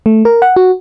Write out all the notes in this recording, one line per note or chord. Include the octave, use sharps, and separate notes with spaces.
A3
A#4
F#5
F#4